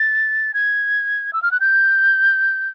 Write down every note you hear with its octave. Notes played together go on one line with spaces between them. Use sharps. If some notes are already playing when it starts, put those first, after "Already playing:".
Already playing: A6
G#6
E6
F6
F#6
G6